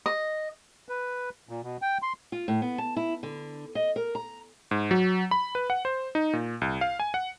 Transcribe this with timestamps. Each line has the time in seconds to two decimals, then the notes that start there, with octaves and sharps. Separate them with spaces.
0.06 D#5
0.89 B4
1.49 A#2
1.63 B2
1.82 G5
2.02 C6
2.32 F4
2.48 A2
2.62 B3
2.78 A5
2.96 E4
3.23 D3
3.75 D#5
3.96 A#4
4.15 A#5
4.71 G#2
4.91 F#3
5.31 B5
5.55 B4
5.70 F#5
5.85 C5
6.15 D#4
6.33 A#2
6.61 C2
6.81 F5
7.00 G#5
7.14 F#5